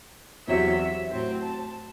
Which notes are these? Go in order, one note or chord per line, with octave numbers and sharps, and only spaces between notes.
E2 C3 F#3 E5
A2 F#3 C4 C5
A5